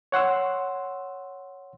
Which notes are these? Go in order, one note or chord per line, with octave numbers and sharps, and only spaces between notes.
C#5 F#5 C6 E6